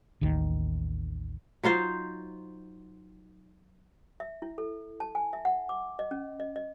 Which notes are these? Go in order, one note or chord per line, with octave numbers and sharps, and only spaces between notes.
A1 D#2 D#3
F#3 D#4 F4 C5
E5
E4
A4
A5
G#5
E5
F#5
D6
D#5
C#4
D#5
D#5